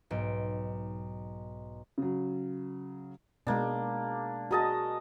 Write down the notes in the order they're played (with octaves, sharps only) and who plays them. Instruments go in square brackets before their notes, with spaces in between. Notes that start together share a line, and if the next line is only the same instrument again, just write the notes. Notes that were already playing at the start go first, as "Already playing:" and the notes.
[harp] B1 G#2 D7
[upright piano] C#3 F#3
[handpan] B2 G#3 [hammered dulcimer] A#3 D4
[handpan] F#4 G#4 [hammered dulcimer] A#4 D#5 A5